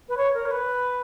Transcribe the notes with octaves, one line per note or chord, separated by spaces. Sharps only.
B4
C#5
A#4
C#5
B4